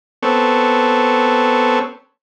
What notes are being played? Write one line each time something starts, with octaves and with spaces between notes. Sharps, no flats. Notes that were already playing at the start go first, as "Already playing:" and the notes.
B3 C4 A4 C#5